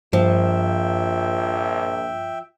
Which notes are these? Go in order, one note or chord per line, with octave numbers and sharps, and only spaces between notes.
A#1 G2 F3 E5 G5